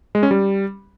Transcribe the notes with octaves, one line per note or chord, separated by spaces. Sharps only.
G#3
C#4
G3